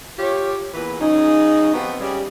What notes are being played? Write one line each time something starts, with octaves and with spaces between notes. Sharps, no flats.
F4 G4 C#5
E2 A#2 E3 B4
C#3 F#3 D#4
F3 B3 C4 F#4 G4 B4
C#3 G3